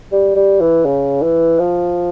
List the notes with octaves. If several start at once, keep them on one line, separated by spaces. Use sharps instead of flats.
G3
G3
E3
C#3
E3
F3